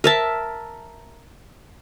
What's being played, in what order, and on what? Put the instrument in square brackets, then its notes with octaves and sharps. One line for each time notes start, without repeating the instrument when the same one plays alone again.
[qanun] A#4 E5 A5